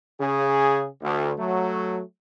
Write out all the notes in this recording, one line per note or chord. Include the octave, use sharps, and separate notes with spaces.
C#3 G#4
D2
F#3 A3